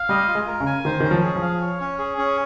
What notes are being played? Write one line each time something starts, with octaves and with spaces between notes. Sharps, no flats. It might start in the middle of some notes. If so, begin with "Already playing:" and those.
Already playing: F5
G3 D#5
F4
G#3
A#4
C#3
G#5
D#3 C5
D#3 C#4
F3
G#4
F3
F5
C#5
C#4
G#4
C#4